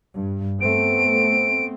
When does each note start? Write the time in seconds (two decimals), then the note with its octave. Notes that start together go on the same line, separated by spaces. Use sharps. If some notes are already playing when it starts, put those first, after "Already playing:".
0.15 G2
0.61 A3 B3 C4 D7